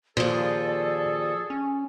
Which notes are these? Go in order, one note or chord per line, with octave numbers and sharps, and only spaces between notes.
D#2 A#2 F3 G#4 A4 D5
C#4